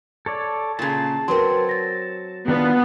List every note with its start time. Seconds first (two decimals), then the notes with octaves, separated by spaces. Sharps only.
0.26 A4 C#5 D5
0.79 A#2 C#3 A5
1.28 F#3 C4 A#4 B4 C6
1.69 A6 A#6
2.48 D#3 B3 D4 F4